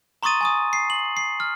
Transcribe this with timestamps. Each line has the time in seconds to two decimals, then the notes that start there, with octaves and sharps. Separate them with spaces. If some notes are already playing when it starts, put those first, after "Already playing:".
0.23 A#5 C6 C#6 D#6 A6 D#7
0.41 G#5 C#6 D#6
0.73 C7
0.90 F#7
1.17 C7
1.40 F6